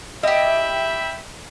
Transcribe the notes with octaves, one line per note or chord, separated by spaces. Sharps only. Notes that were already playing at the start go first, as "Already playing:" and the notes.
E4 G4 D#5 E5 G5 B5